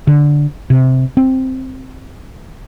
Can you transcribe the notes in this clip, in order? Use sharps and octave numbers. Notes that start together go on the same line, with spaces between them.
D3
C3
C4